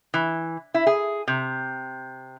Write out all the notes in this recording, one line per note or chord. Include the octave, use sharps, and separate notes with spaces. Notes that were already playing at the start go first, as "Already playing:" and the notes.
E3
E4
G#4
C3